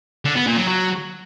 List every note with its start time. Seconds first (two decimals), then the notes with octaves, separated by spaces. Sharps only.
0.25 D3
0.36 B3
0.46 A#2
0.57 F#3
0.68 F#3